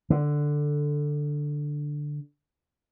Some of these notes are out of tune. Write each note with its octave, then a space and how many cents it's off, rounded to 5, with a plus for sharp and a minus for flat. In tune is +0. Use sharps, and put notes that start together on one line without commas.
D3 +5